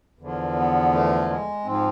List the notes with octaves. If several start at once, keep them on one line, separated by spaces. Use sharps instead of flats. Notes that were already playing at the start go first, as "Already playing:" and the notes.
E2 D3 F3
B3
A3
G#3
G#2 F3 C4